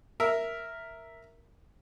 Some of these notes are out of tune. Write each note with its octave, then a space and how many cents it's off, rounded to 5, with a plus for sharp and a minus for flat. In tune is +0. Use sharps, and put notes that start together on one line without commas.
A#4 +0 E5 +0